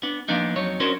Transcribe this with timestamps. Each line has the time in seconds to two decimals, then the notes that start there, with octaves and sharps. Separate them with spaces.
0.03 B3 D4
0.29 F3 A#3 B3 D4 D#4
0.56 F2 F#3 D#4 C#5
0.80 C#4 D4 F#4 A#4 C5